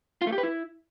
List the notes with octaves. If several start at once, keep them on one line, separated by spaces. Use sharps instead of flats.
F4
A3
G4
B4
E4